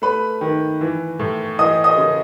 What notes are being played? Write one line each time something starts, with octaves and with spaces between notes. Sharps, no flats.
A3 B4 B5
D#3
E3
A2
E3 D#5 D#6
D#5 D#6
C#3